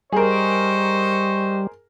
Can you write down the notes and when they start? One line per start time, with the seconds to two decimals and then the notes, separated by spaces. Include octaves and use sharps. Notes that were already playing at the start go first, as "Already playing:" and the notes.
0.12 G3 G#4 A#4 C5 D#5 C#6